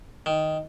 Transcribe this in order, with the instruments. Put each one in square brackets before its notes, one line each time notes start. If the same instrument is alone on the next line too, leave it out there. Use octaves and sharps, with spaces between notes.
[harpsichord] D#3